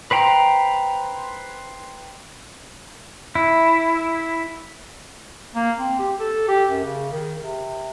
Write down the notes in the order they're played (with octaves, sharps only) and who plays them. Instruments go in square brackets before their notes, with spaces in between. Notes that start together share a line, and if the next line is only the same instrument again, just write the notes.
[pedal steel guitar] B4 C5 G5 A#5
E4
[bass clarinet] A#3
C4
G4
A4
G4
F#2
C#3
D#3
C3